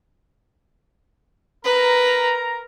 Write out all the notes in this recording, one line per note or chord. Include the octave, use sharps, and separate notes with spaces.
A#4 B4 A#5